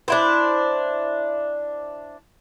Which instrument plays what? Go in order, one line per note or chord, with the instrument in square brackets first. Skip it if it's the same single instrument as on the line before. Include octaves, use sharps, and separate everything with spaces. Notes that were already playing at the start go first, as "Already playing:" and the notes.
[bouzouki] D4 E4 C5